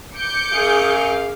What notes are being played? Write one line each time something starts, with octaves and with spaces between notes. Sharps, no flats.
D6 G6 C#7
F#2 G#4 F5